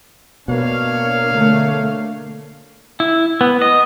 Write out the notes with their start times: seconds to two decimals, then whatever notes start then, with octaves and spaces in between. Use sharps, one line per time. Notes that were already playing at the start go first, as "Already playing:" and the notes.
0.48 B2 A#3 D4 C#5 F5
1.33 D3 A3
3.00 E4
3.41 B3
3.62 D#5